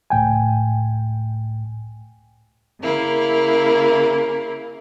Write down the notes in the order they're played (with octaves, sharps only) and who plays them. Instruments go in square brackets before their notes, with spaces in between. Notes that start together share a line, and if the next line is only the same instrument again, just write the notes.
[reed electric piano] C#2 A2 G5 G#5
[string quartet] C#3 A#3 E4